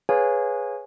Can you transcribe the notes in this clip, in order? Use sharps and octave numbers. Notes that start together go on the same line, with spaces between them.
G#4 B4 C#5 F5 G#5